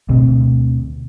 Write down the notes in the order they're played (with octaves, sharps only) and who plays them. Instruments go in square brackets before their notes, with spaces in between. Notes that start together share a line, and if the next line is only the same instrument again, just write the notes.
[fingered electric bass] D2 B2 C4